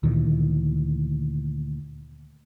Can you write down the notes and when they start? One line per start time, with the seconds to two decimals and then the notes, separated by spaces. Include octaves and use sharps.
0.03 D2 A#2 D#3 E3